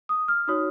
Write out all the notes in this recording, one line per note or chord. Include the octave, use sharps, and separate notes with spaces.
D#6
F6
D#4 F#4 C#5 D#6